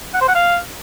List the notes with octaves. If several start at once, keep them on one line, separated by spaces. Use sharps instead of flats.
F#5
C5
F#5
F5